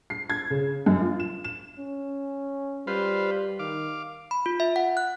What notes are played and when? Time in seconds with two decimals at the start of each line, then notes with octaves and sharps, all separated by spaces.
0.10 C7
0.30 G#6
0.50 C#3
0.86 F#2
1.00 F4
1.20 E7
1.44 E7
1.79 C#4
2.87 G3 F4 B4 C5
3.59 D#3 F5 D6
4.31 B5
4.46 F4
4.60 E5
4.76 F#5
4.97 F#6